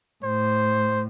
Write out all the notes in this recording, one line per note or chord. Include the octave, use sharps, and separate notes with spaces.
A2 C5